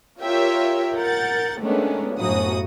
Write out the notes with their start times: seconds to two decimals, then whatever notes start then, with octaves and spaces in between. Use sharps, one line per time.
0.21 F4 G4 A#4 C#5 E5 G5
0.95 A#4 F#5 G6 A6
1.61 D#3 G#3 A3 B3 C#4 D4
2.16 G1 F#2 A2 F#4 D#6